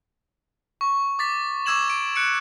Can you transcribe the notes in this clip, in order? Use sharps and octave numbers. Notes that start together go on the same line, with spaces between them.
C#6
D6 A6 B6
C#6 D6 E6 G#6 E7 F#7
D7
F#6 C#7 D7